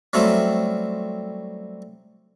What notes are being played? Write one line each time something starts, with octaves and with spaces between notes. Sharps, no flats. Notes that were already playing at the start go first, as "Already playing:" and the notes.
F#3 G3 A3 C4 C#4 E4